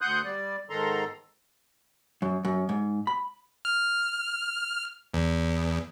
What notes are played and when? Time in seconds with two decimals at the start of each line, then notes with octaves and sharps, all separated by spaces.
0.01 D2 F#5 C6 D#6 F#6 G6
0.25 G3 D5
0.70 G#2 D#3 A4 A#5 C6
2.22 F#2
2.45 F#2
2.69 G#2
3.07 B5
3.65 F6
5.14 E2